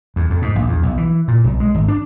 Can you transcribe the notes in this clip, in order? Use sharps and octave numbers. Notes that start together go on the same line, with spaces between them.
E2
F2
G#2
A#1
E2
B1
E3
A#2
B1
G#3
G#1
D4